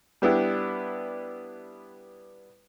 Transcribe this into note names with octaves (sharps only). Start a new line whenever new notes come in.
G3 B3 D4 E4 G4